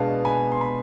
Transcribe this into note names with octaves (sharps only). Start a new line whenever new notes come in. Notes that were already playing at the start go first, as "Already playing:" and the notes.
Already playing: B2 G#3 B3 D4 F5 A5
G#5 B5
C6
B5